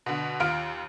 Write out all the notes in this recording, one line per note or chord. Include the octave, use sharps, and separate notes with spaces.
B2 D3
D#2 F4 F6 D7